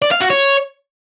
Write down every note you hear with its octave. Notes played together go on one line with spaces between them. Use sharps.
D5
F5
F#4
C#5